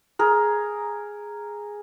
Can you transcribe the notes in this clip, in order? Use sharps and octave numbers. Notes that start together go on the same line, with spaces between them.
G#4 A#4